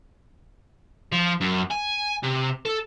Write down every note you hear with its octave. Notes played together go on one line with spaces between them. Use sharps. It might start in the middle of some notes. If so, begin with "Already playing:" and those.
F3
F#2
G#5
C3
A4